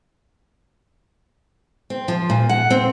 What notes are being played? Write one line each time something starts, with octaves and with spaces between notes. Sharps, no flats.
C4
F3
A#2
F#5
C4